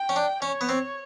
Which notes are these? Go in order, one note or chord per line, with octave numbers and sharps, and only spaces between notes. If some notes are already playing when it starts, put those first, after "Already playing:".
Already playing: G5
C#4
D4
C#4 C#5
B3
C4